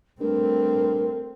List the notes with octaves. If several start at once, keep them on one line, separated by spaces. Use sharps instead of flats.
G2 A3 C4 A#4